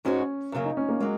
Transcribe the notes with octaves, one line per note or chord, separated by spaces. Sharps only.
G#2 G#3 C#4 D#4 F#4 C#5
F#2 C#3 F#3 A#3
D#4
C#4
A#3
F#3 G#3 A#3